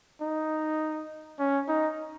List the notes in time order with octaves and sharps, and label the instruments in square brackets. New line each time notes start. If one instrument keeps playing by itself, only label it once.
[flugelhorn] D#4
C#4
D#4